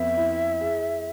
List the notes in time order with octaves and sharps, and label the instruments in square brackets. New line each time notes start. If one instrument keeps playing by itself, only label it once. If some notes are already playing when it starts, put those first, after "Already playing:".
Already playing: [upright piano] F2 B3 [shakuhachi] E5
[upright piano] E4
G#4